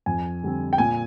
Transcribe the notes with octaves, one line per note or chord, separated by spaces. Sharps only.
F2 G#5
D3 G3 C4
G5
A#2 G#5